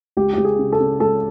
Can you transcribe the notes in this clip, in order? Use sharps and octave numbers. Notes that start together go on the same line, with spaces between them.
C#2 G4
C#2 G4
G#4
C#3
A4
C#3
C#2 A4